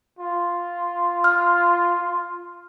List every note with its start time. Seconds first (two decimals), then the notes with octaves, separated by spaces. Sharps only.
0.19 F4
1.24 F6